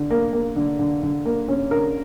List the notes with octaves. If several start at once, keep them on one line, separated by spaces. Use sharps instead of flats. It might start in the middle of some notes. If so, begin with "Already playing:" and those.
Already playing: D3
A#3
A#3
D3
D3
D3
A#3
C#4
D3 A#4